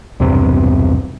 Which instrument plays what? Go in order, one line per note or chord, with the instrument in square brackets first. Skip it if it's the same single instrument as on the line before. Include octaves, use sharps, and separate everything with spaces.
[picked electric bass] B1 E2 G2 C3